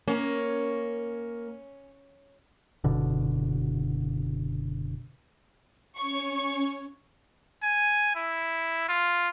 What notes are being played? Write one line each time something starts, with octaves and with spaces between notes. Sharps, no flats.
A#3 C#4
F#1 B2 D3
C#4 C#5 C#6
G#5
E4
F4